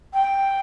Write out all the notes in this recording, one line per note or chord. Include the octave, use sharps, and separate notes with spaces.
G5